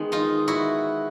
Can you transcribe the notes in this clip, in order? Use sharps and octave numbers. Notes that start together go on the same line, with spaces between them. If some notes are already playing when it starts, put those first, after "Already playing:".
Already playing: D#3 G#3 B3
D#4 F4
E4 F#4